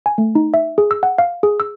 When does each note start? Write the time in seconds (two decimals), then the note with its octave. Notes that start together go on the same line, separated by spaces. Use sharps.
0.06 G#5
0.18 A3
0.35 D#4
0.54 E5
0.78 G#4
0.91 E6
1.03 F#5
1.18 F5
1.43 G#4
1.60 E6